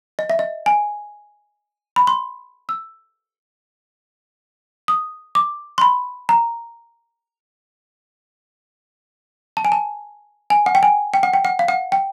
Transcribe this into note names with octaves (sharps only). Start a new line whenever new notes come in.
D#5
E5
D#5
G#5
B5
C6
E6
D#6
D6
C6
B5
A#5
A5
G#5
A5
G#5
F#5
G5
G#5
G5
F#5
G5
F#5
F5
F#5
G5